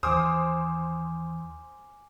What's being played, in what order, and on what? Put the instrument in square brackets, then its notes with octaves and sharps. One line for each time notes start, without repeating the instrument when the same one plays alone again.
[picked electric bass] D#2 E3 [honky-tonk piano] C5 D#6 [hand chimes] G#5 D6 F6